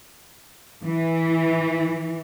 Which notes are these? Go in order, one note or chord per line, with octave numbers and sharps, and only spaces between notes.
E3